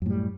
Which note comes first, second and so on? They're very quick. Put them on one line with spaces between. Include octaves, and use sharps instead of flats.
F#2 A2 G3